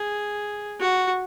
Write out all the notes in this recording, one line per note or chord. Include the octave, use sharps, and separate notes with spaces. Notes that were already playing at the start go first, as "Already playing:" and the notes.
Already playing: G#4
F#4